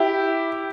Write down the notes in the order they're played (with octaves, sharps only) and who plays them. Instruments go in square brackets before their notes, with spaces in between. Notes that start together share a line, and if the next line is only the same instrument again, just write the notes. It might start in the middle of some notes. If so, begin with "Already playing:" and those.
Already playing: [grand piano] E4 G4